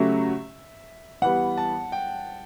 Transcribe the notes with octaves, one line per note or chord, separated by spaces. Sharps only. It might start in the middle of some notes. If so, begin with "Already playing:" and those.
Already playing: C#3 F#3 A3 C#4 G4 E5
E3 G3 B3 F#5
A5
G5